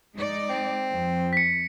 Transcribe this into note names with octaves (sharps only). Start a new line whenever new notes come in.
G#3 D#4 D5
C4
F2
B6 C#7